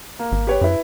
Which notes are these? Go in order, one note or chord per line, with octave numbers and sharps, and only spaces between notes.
A#3
G#1
G4 B4 C#5
F#2 E4 B4